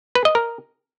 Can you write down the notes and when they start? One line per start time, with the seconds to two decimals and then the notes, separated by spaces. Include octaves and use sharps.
0.15 B4
0.25 D#5
0.35 A#4